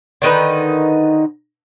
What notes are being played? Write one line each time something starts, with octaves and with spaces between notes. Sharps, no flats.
D3 D#3 D#4 B4